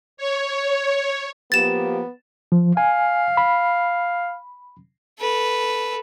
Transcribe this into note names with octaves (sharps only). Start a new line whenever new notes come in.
C#5
F3 A#3 B3 G4 A6 E7
F3
F5 G#5
B5
A4 B4